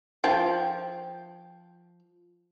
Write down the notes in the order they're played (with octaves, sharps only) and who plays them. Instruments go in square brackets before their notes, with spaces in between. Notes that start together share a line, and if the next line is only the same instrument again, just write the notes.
[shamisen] F3 G5